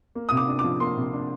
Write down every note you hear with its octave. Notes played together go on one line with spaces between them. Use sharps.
A#3
C3 D#6
D6
D4
D6
F3
A#3 C6
C3
D4